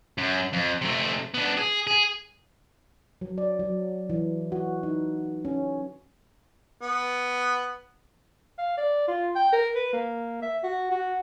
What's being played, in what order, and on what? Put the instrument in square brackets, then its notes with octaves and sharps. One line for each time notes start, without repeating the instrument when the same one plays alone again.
[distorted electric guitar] F#2
F2
C3 A3
B3 D4
G#4
G#4
[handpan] F#3
D5
F#3
E3
F#4
D#4
C#4
[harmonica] B3
[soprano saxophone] F5
D5
F4
G5
A#4
B4
A#3
E5
F#4
F#4